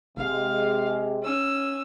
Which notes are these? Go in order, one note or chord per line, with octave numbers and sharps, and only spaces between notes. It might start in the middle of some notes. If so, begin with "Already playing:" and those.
F1 C3 G#3 F5
C#4 E6